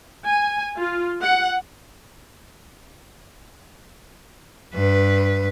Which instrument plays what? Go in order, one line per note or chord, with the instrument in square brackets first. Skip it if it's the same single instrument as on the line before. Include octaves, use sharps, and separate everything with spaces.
[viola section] G#5
F4
F#5
[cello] G2 B4